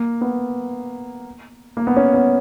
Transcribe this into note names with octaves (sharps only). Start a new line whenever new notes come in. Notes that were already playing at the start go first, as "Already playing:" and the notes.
Already playing: A#3
B3
A#3
B3
C#4
B3